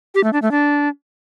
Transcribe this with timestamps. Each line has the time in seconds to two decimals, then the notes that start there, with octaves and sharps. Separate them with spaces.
0.15 G4
0.24 A3
0.33 D4
0.42 A3
0.51 D4